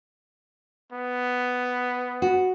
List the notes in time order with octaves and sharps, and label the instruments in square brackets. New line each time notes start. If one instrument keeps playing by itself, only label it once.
[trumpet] B3
[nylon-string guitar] F#4